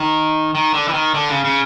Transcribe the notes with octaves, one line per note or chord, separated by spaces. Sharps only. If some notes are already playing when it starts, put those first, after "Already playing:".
Already playing: D#3
D#3
D3
E3
D#3
D3
C#3
C#3